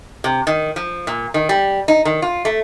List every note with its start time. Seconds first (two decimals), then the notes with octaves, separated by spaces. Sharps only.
0.24 C3
0.47 D#3
0.76 F3
1.07 A#2
1.34 D#3
1.49 G3
1.88 D#4
2.05 D#3
2.22 F4
2.45 A3